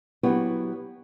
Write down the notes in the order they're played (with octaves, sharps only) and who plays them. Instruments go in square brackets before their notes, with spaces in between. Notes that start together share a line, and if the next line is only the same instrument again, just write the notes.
[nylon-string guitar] F#3 B3 E4 G4 B4 C#5